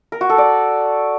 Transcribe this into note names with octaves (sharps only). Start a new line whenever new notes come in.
A#4
F#4
A4
D5